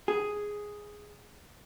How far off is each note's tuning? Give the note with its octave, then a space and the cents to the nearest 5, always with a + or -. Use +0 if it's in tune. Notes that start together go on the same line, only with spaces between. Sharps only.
G#4 +0